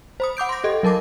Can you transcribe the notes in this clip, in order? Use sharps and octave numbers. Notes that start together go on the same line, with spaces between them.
C5 B5 D#6
F#5 D6 G6 D7
C6 A#6
G4 A4 D#5
F#3 A#4 A5 D6 A#6